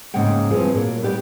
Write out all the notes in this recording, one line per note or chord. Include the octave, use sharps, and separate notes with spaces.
G#2 C#3 G#3 A#3 F#5 G5
E2 G2 F3 C4 G#4
A#2 D3 F#3 A#3
G3 B3 G4 D5